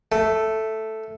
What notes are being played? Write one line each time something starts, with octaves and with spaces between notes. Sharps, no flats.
A3